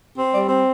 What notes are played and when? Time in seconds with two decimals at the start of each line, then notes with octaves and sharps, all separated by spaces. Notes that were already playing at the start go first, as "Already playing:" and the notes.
0.18 C4
0.34 G3 D5
0.49 C4